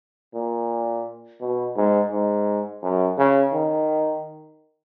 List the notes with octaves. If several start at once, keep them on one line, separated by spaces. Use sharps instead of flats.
A#2
B2
G#2
G#2
F#2
C#3
D#3